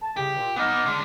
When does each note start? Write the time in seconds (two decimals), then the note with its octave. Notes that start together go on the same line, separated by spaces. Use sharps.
0.02 A5
0.17 C2 C#3 G4
0.36 A#2
0.56 B3 D#4 F#5 D6 F6
0.86 D3 G#3